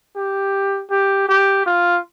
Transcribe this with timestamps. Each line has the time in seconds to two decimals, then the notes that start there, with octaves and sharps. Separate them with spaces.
0.16 G4
0.91 G4
1.29 G4
1.66 F4